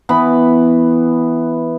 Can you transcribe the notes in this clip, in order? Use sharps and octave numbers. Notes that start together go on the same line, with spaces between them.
E3 B3 B5